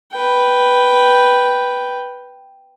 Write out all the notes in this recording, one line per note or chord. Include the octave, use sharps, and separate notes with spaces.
B4 G5